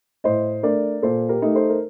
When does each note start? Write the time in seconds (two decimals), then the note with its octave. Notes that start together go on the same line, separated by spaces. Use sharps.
0.24 A2 C5 D#5
0.63 A3 D4 A#4 D5
1.02 A#2 A4 C5
1.29 G4 A#4
1.42 A3 D#4
1.55 A4 C5
1.70 A#4